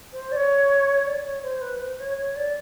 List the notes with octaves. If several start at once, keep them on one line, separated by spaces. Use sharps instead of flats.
C5
D5
C#5
D5
C#5
C5
B4
C5
C#5
C#5
D5